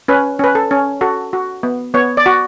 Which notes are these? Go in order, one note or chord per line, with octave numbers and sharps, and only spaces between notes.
C#4 B4
C#4 B4
A4
C#4
F#4 A4
F#4
B3
B3 C#5
D5
F#4